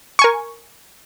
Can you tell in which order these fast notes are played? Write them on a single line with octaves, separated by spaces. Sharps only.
C#6 G#5 A#4